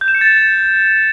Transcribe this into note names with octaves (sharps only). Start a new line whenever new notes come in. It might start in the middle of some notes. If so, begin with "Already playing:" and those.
G6
E7
C#7
A6
E7